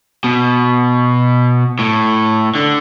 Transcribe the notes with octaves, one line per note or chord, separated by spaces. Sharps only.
B2
A2
D3